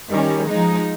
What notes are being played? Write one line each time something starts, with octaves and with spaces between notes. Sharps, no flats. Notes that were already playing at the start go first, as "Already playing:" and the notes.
D#3 G3 C#4
F3 G#3 D#4